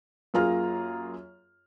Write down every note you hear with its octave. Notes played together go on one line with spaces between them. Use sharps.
F#2 A#3 F4 G#4 A#5 F6